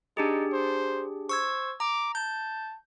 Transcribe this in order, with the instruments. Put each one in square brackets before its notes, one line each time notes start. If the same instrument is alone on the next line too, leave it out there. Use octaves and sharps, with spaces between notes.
[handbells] D4 G4 G#4 [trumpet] D#4
[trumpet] C5
[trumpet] C5 [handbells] C#6 E6 G#6
[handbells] A#5 [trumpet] D6
[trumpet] A5 [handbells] G6